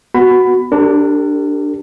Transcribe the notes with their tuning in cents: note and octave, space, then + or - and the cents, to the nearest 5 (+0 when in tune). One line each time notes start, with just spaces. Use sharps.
B3 +0 F#4 +0 B5 +15
D4 +0 G4 +0 A#4 -45